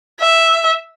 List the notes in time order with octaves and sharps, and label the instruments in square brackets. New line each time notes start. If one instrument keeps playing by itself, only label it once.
[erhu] E5